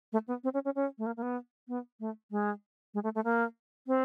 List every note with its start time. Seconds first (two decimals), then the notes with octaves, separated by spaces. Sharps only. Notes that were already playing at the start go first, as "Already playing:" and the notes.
0.13 A3
0.28 B3
0.44 C4
0.54 C#4
0.65 C#4
0.75 C#4
0.98 A3
1.06 A#3
1.17 A#3
1.22 B3
1.68 B3
2.00 A3
2.31 G#3
2.94 G#3
3.04 A3
3.15 A3
3.25 A#3
3.87 C4